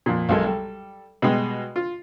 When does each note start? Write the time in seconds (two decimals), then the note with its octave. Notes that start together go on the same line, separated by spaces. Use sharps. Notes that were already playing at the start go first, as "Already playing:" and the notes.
0.06 F2 A#2
0.29 B1 F#3 G#3 A4 A#4
0.44 G3 A4
1.22 B2 G3 G#3
1.76 F4